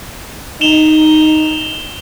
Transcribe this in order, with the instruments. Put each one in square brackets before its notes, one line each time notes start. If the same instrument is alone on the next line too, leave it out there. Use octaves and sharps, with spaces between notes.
[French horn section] D#4 [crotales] E7 F7 G7